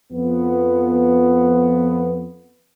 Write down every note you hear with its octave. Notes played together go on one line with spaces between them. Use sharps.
F2 F3 B3